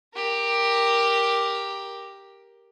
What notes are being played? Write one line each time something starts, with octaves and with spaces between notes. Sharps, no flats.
G4 A#4